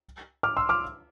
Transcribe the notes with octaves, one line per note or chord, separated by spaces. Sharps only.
D6 F6
C6 E6
D6 F6